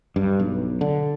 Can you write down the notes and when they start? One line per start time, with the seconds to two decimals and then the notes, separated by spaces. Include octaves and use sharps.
0.16 G2
0.39 B1
0.81 D3